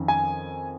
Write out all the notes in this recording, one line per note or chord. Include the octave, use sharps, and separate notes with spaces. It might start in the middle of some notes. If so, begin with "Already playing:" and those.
Already playing: F2 D#3 C#4
G#5